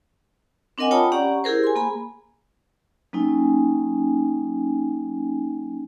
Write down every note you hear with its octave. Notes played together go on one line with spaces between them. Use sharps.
C4 D4 A#4 D#5 F#5 G#5
F4 C#5 G5 A5 B5 D#6
C#4 G4 D5 F#5 A#5
E4 G4 G#4 A#4 C5
G#5 C6
A#3 G#4 G#5 B5
F#3 A#3 C#4 D#4 G5 G#5